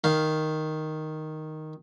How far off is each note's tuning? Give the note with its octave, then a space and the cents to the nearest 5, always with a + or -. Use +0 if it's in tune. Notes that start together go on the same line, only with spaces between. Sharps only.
D#3 +0 F5 +0